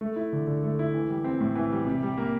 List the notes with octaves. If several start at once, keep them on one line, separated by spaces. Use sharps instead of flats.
A3
E4
D3
D3
A3
E4
E3
G3
C4
A2
E3
G3
C3
G3
A#3